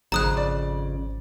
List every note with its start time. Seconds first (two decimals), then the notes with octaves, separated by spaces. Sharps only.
0.12 G#1 F2 C#3 A#5 D#6 F#6
0.37 D5